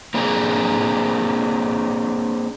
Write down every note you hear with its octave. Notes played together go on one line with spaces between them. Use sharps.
A#3 C4 D4 G#4 A#4